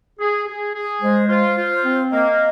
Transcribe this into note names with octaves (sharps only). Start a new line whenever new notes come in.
G#4
G#4
G#4
G#3 C5
F4 C5
F4
C4
A#3 D#5